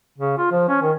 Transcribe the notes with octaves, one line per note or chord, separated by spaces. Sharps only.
C#3
F4
F3
C#4
D#3